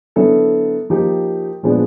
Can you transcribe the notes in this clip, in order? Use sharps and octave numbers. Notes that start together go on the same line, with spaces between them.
D3 F#3 B3 E4 A4
F3 A#3 D#4 G4
A#2 F3 G#3 B3 D4